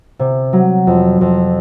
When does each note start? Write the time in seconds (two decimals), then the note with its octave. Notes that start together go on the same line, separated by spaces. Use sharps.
0.19 C3
0.53 F#3
0.87 F2
1.21 F2